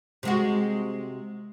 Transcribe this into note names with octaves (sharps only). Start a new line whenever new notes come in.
C3 G#3 F#4